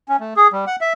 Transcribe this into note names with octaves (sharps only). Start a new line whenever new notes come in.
C#4
A3
G#4
G3
F#5
E5